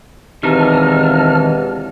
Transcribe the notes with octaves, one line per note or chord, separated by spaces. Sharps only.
E1 C3 D#3 E3 D#4 A5 F6